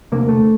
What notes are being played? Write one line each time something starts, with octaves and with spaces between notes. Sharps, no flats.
E1 D2 C3 A#3
A3